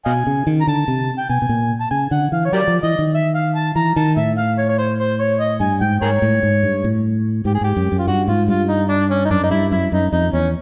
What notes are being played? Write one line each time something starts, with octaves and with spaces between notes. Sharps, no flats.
B2 D#5 F5 G#5
C#3
D#3
A#5
D3 A5
C3
G5
B2 G#5
B2
A#2
A5
C#3 G#5
D3 F#5
E3 F5
C#5
F#3 G4 A#4 D5
F3
E3 D#5
D#3
E5
F5
A5
E3 A#5
D#3 A5
A2 E5
F5
C#5
C#5
C5
C5
C#5
D#5
G2 G#5
G#2 G5
G#2 G#4 A#4 C#5
A2
G#2
G2
A2
G#2 G4
G#4
G#2 G4
F#2
F#2
F4
G2 F#4
G#2 F4
G2 F4
D#4
D4
C#4
D#4
F#2 D4
D#4
G2 E4
F#2 E4
F#2 D#4
F2 D#4
E2 C#4